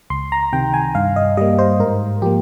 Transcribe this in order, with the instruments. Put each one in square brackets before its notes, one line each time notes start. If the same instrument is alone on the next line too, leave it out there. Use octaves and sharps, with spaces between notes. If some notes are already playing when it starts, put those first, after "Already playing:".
[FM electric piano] C#2 C6
A#5
C3 D#3 G5
G#5
G2 F5
D#5
G3 A#3 D#5
C5
G#2 A#4
F3 A#3 G4